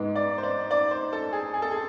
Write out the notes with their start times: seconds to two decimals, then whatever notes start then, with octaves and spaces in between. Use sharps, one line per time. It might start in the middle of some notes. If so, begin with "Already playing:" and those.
Already playing: G#2 G#3 B3
0.16 D5
0.38 C5
0.43 D5
0.71 D5
0.91 C5
1.13 A4
1.33 G#4
1.54 G#4
1.62 A4
1.71 G#4